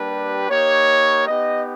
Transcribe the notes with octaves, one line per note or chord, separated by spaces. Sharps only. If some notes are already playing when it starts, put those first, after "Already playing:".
Already playing: G3 A#3 D4 G4 B4
A#3 D#4 G4 C#5
B3 D#4 G4 D#5